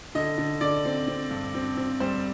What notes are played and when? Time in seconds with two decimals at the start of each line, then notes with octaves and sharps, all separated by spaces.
0.15 D3 D#5
0.38 D3
0.61 D3 D5
0.85 C4
1.08 C4
1.30 G2
1.55 C4
1.77 C4
2.00 G3 C5